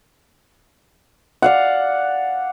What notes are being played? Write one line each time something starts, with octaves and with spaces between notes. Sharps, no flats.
D5 F5 F#5